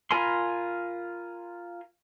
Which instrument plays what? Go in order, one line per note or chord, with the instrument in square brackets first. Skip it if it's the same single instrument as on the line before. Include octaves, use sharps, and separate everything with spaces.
[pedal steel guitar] F4 A#4 G#5 B5 C6